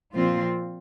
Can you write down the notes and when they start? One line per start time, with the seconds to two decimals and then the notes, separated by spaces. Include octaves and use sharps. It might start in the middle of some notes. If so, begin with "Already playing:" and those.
0.14 A#2 F3 C4 F4